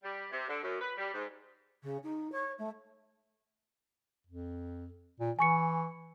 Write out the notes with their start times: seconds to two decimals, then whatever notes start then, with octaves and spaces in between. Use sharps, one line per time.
0.03 G3
0.31 C3
0.49 D3
0.62 F#2
0.81 B4
0.97 G3
1.14 G#2
1.83 C#3
2.03 D#4
2.31 C#5
2.58 A3
4.27 F2
5.20 A#2
5.39 E3 G#5 C#6 C#7